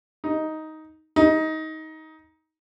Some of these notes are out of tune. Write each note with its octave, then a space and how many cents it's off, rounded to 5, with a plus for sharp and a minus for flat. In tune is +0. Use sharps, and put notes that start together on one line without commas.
D#4 +10
D#4 +20